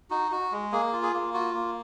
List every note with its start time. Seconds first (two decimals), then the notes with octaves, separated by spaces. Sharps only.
0.10 D#4 F#4
0.32 F#4
0.52 G#3
0.72 A#3 G#4
0.93 F4
1.03 G#4
1.13 A#3
1.34 F4 F#4
1.54 A#3